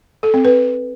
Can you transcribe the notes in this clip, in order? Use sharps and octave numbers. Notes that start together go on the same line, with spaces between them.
A4
C4
B4